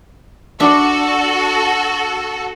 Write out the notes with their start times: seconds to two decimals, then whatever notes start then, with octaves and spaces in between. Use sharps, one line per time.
0.60 D4 F#4 A4 E5